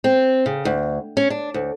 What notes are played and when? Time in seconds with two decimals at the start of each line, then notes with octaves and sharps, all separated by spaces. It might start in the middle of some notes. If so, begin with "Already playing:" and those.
0.04 C4
0.46 C#3
0.65 D2
1.17 C#4
1.30 D4
1.54 D2